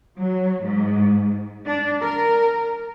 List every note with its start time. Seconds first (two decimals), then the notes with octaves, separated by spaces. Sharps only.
0.17 F#3
0.64 G#2
1.67 D4
2.02 A#4